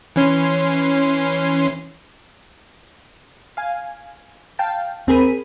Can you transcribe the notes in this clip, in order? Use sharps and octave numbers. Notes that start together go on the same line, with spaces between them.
E3 C#4 C6
F5 G#5
F5 G5 A5
D#2 C4 G#4 A#4 B5 D#7